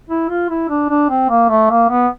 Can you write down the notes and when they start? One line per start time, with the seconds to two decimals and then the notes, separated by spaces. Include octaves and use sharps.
0.09 E4
0.29 F4
0.50 E4
0.69 D4
0.89 D4
1.09 C4
1.30 A#3
1.49 A3
1.70 A#3
1.90 B3